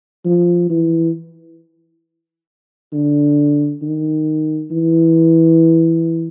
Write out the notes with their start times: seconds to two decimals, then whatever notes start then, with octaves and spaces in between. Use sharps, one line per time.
0.25 F3
0.70 E3
2.92 D3
3.82 D#3
4.71 E3